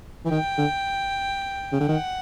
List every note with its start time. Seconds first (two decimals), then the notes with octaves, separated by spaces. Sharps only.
0.25 E3
0.31 D#3 G5
0.58 D3
1.72 C#3
1.80 D3
1.88 D#3 F#5